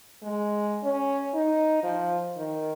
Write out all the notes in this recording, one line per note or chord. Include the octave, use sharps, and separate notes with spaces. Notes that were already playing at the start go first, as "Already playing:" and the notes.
G#3
C#4
D#4
F3
D#3